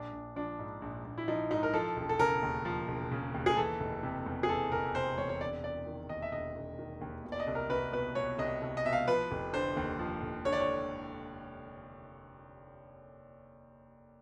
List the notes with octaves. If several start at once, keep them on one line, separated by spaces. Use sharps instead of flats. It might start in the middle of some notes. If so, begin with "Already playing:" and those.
Already playing: A#1 D4
A#1
F3 D4
G#2
A#1
A#1
E4
F3 D#4
G#2 D#4
A#4
F3 A4
E1
A4
C#3 A#4
D#2
F3
E1
C#3
D#2
G#4
E3 A4
F1
C3
E2
G#4
E3 A4
F1 A#4
C3 C5
E2 C#5
C#5
E1 D5
E1 D5
D#3
D#2 D#5
E5
E1 D#5
E1
D#3
D#2
B2
D5
D#5
C2
A#4
C2 B4
B2 B4
B2 C#5
C2 D#5
C2
D#5
B2 E5
F5
F3 B4
F1
D3 C5
D#2
F3
F1
D3 C#5
D5
C#5